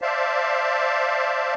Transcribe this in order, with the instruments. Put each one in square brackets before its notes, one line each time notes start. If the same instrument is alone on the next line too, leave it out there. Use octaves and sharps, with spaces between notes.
[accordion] C5 D5 E5 F5 A5